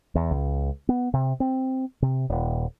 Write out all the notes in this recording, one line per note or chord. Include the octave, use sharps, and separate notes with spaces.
E2
C#2
B3
C3
C4
C3
D#1